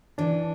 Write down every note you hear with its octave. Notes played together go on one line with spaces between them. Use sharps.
E3 D4